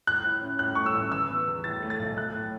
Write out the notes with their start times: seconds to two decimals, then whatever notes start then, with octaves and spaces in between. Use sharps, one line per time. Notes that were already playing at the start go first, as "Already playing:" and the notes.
0.07 A2 F#6
0.25 E4
0.41 C#4
0.59 A2 F#6
0.75 A3 C#6
0.86 E6
0.95 A1
1.12 E3 E6
1.30 B3
1.47 E2
1.64 A2 A6
1.82 A3
1.90 A6
1.99 B1
2.17 A3 F#6
2.35 A2